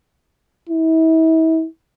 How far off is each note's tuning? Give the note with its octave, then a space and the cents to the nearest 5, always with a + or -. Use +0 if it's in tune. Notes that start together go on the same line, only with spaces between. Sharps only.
E4 -40